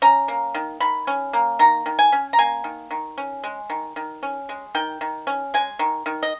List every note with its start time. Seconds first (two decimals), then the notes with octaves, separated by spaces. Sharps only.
0.02 C#4 A#5
0.28 A#3
0.55 D#3
0.80 D#3 B5
1.07 C#4
1.33 A#3
1.59 D#3 A#5
1.86 D#3
1.99 G#5
2.12 C#4
2.33 A#5
2.38 A#3 G#5
2.64 D#3
2.91 D#3
3.18 C#4
3.44 G#3
3.70 D#3
3.96 D#3
4.23 C#4
4.49 G#3
4.75 D#3 G5
5.01 D#3
5.27 C#4
5.54 G#3 G#5
5.79 D#3
6.06 D#3
6.23 D#5